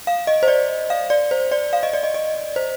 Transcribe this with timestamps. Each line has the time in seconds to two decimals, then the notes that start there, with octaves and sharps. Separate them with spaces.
0.07 F5
0.27 D#5
0.43 C5
0.48 D5
0.90 F5
1.10 D5
1.31 C5
1.52 D5
1.73 F5
1.83 D#5
1.93 D5
2.03 D#5
2.14 D#5
2.56 C5